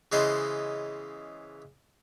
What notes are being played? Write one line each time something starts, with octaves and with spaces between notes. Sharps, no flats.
C#3 E3 G#3 B3 C5 D#5